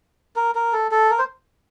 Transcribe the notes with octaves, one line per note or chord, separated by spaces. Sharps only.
A#4
A#4
A4
A4
A#4
C5